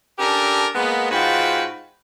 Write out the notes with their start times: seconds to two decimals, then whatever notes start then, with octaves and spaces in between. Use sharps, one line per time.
0.19 C#4 D4 G4 A4 A#4
0.74 G#3 A#3 B3
1.11 G#2 F4 F#4 B4 G5